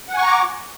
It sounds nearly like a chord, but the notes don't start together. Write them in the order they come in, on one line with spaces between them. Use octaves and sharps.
F#5 G#5 C#6 A#5 D6